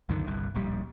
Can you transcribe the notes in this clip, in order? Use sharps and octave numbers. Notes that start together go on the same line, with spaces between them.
C2 F#2 D3 D#3
G1 C2 G2
D1 A#1 G3